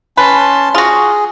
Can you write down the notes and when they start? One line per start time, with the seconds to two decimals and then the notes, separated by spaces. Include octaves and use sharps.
0.17 C#4 B4 A5 C6
0.74 F4 F#4 G#4